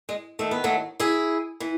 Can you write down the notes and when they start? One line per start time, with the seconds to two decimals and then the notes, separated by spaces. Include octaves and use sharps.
0.09 G#3
0.39 D#2 D#3 A3
0.51 B3
0.64 F#3 A3
1.00 E4 G#4
1.60 E3